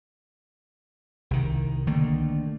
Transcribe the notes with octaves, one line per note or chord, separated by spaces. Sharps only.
C2 D#3
D3 D#3 A3 A#3